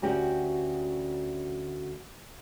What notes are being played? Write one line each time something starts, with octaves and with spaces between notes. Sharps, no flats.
D2 C#4 F#4 G4 G5